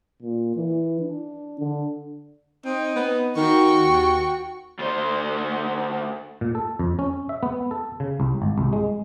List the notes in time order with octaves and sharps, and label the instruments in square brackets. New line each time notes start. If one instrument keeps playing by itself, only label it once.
[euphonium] A#2
E3
D4
D3
[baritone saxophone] C4 [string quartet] D#4
[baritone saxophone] B3
[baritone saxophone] D#3 [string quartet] F#4 G5 C#6
[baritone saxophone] D#2
[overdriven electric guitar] D2 C5
[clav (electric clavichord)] A#2
A4
F2
C#4
E5
B3
A4
C#3
C2
G#1
C2
G#3